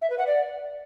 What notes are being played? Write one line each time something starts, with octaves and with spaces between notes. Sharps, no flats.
E5
B4
F#5
D5